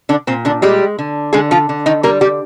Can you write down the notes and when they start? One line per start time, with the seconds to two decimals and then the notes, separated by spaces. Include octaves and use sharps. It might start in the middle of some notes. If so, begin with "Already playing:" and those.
0.09 D3 D4
0.27 A#2 C4
0.45 D3 D4
0.62 G3 G#3 G4
0.99 D3
1.33 D3 G#3 G#4
1.51 F3 F4
1.69 D3
1.86 D#3 D#4
2.03 G3 A#3 A#4
2.21 G3 G4